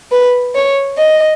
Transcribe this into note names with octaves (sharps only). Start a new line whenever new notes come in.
B4
C#5
D#5